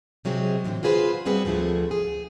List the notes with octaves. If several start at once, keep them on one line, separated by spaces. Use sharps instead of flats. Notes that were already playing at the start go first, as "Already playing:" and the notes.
C3 F#3 G#3 C4 G#4
A2 D3 E3 A#3 C4
F4 F#4 G#4 B4 C5
B2 G3 C4 G#4 B4 F#5
D2 D3 F3 A3 G#4
G#4